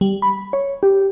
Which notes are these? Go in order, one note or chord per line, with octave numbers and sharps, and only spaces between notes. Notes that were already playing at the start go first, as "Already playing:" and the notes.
G3
B5
C#5
G4